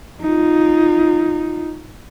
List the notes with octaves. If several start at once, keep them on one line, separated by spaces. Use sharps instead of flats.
D#4 F4